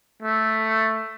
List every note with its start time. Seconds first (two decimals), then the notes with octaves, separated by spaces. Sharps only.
0.22 A3